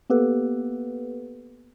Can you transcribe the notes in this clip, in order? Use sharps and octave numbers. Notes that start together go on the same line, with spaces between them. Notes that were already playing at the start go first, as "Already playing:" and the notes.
A#3 B3 G4 A4 B4